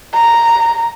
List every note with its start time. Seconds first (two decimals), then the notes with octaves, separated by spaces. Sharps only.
0.14 A#5